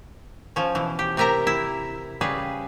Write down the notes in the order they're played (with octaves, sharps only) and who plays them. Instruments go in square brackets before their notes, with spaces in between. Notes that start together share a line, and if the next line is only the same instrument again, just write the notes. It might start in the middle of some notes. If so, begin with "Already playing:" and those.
[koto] F3 C#4
B2 E3
G4
C3 G4 A#4 E5 A#5
E4
C#3 G3 G#4 B4